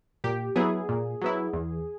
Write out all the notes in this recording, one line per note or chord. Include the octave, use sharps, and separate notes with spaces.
A#2 G4
F#3 B3 E4 G#4
A#2
F#3 B3 E4
E2